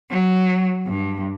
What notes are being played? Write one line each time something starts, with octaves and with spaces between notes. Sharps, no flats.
F#3
G2